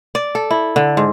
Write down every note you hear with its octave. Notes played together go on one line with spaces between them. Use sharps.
D5
A4
E4
D3
G#2